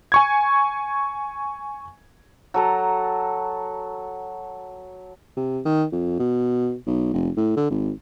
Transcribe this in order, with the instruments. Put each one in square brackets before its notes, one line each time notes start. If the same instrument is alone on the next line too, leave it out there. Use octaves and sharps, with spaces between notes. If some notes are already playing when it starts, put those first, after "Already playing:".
[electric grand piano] G#5 C#6 G#6
[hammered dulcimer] F#3 A4 A#5
[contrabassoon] C3
D#3
F2
B2
B1
F1
A2
D3
G#1